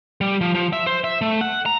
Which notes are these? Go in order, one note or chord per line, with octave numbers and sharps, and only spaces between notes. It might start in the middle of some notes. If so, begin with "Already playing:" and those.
G3
F3
F3
E5
C5
E5
A3
F#5
A#5